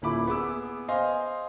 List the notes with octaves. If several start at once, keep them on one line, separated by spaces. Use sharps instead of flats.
D#1 A#2 E4 B5 D6
B3 G#4 D6 E6
C5 D#5 F5 G#5 C6